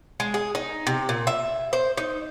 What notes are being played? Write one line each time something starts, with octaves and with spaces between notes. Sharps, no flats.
G#3
G#4
D#4
C3
A#2
E5
C5
D#4